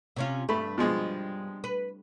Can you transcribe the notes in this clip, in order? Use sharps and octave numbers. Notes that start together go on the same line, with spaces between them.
C3 C#4 F4
G2 A3 B5
B2 F3 G#3
B4